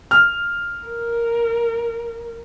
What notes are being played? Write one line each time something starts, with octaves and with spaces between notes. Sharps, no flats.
F6
A#4